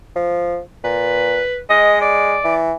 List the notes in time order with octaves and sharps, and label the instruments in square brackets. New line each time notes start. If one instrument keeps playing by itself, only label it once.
[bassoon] F3
[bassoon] A#2 [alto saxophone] B4
[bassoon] G#3 [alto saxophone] D#5
[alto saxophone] D5
[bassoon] E3